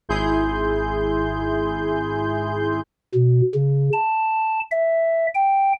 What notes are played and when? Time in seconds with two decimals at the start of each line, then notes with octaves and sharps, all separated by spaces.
0.09 G#1 E4 G#4 C6 G6
3.14 B2
3.55 C#3
3.93 A5
4.71 E5
5.35 G5